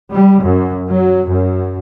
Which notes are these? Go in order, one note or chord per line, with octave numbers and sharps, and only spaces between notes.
G3
F#2
F#3
F#2